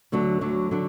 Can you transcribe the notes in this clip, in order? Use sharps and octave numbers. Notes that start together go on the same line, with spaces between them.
D2 D3 F#3 D4
D2 D3 F#3 D4
D3 F#3 D4